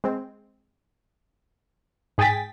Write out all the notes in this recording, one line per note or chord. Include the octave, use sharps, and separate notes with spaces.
G#3 C4
G#2 G#4 G5 G#5 A6 B6